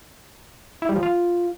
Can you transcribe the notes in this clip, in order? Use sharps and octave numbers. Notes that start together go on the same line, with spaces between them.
E4
G3
F3
F4